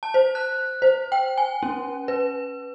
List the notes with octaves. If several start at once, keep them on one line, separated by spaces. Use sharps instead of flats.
A5
C5
F#6
C5
G5
G#5
C#4
B4